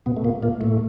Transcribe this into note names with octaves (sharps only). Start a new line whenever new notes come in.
B2 B3
A3
A#2 A#3
A#2 A#3
A2 A3